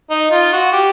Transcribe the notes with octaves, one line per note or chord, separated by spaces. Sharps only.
D#4
F4
F#4
G4